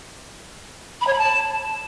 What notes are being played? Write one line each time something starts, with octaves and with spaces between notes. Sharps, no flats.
B5
C#5
B5
A5